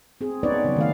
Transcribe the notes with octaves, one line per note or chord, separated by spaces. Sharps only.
C4 G#4
B3 C#4 D#4 B4 C#5 D5
C#3 F#3
D#3 A3 F5